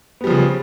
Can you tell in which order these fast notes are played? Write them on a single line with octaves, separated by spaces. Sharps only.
B3 G3 F3 C#3